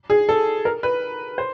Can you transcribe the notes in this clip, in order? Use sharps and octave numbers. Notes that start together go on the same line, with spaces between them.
G#4
A4
A#4
B4
C5